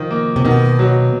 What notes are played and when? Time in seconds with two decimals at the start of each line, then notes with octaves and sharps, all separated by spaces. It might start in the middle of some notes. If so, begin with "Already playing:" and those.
Already playing: D#3 F3
0.11 A#3
0.36 C3
0.45 B2 D#3
0.79 F#3